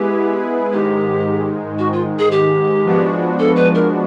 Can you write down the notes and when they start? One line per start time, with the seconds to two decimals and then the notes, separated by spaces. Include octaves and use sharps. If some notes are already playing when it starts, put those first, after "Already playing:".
Already playing: G#3 B3 E4 G4 G#4 B4
0.72 G#2 D#3 G#3 G4
1.79 F#4
1.93 F4
2.19 G#4
2.32 G4
2.85 F3 G#3 B3 D4 F#4
3.39 A4
3.56 B4
3.75 A#4